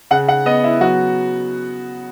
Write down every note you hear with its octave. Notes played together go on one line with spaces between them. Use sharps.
C#3 F#5
F#5
B3 D#5
E4
F#3 F#4